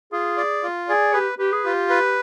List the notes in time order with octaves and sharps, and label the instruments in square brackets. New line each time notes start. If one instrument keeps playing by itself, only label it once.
[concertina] F4 [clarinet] G#4
[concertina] D5
F4
[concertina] G#4 [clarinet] D5
[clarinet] G4 [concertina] B4
[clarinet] G4 [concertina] B4
[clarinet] G#4
[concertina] F4 [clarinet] G4
[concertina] B4